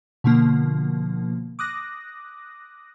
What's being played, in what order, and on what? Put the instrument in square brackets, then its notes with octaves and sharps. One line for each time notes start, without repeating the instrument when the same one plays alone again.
[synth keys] B2 D3 F3 A#3
D6 D#6 F#6 A#6